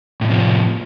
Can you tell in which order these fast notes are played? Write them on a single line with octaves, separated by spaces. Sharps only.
A2 D#3 C3 F3